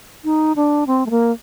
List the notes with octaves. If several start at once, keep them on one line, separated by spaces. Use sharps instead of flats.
D#4
D4
C4
A3
A#3